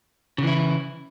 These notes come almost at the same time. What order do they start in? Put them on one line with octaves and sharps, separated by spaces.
C#3 E3 E4